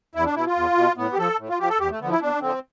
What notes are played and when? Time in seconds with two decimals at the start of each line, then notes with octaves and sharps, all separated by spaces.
0.15 E2 E4
0.26 D4
0.36 B2 E4
0.46 F4
0.56 E2
0.77 B2
0.97 A2 B3
1.13 G4
1.18 F3 A4
1.39 A2
1.49 F4
1.59 F3 G4
1.69 A4
1.80 E2 G4
1.90 A3
2.00 D3 F3 B3
2.10 E4
2.21 E2 D4
2.41 D3 F3 C4